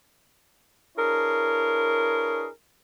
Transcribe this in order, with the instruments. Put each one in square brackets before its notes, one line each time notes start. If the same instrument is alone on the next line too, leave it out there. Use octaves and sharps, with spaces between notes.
[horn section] D4 E4 G#4 A#4 B4 C#5